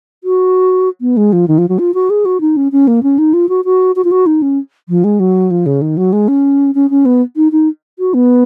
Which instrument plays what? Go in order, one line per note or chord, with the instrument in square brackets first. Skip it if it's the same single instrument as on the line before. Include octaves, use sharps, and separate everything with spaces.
[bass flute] F#4
B3
G#3
F3
D#3
F3
F#3
F4
F#4
G#4
F#4
D#4
C#4
C#4
A#3
C#4
D#4
F4
F#4
F#4
F#4
F4
F#4
D#4
C#4
F3
G#3
F#3
F3
C#3
D#3
F#3
G#3
C#4
C#4
C#4
B3
D#4
D#4
F#4
B3